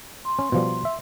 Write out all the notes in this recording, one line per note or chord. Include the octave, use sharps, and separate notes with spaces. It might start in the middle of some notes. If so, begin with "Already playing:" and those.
C6
C#4
B2 F3 G3
E5